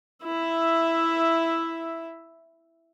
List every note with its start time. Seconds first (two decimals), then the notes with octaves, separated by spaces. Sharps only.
0.24 E4 E5